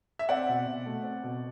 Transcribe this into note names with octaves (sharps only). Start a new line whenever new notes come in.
E5
C4 D5 F#5
B2
B2
A3
C4
B2